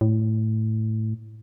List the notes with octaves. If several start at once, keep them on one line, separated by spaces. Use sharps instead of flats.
A2